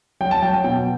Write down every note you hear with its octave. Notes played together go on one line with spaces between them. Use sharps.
F#3 G5
A5
F#3 G5
G5
B2 G5